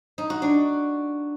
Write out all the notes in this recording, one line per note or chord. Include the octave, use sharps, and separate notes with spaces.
D#4
F#4
D4